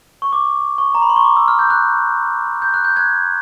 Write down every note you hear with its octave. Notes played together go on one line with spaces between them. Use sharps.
C#6
D6
C#6
A#5
B5
C6
C#6
D6
E6
F6
G6
F#6
G6
F#6
G6
F#6 G#6